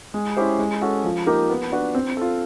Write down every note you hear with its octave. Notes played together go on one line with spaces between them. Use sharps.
G#3
C#4 E4 G4 C5
G#3
C#4 F#4 A4
F3
A#3 D#4 G4 A#4
B3
D4 F#4 B4
C4
F4 A4